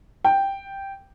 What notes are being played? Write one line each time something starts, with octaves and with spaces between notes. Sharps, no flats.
G5